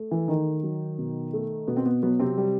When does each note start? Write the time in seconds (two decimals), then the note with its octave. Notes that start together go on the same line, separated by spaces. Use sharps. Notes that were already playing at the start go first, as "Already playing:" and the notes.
Already playing: A3
0.11 E3 E4
0.28 D#3 D#4
0.63 F#3
0.99 B2
1.33 A3
1.68 B2 B3
1.77 C4
1.85 B3
2.03 F#3 B3
2.19 C3 C4
2.38 G3